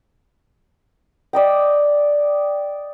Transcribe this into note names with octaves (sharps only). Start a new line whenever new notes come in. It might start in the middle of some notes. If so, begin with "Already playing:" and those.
D5 D#5 G5